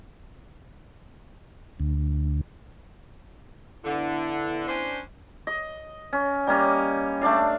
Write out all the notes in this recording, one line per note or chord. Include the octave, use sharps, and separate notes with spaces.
D2
D3 B3 E4
C#4 D4 C5
D#5
C#4
G3 A#3 C#4 D#5
A3 D4 D5 F5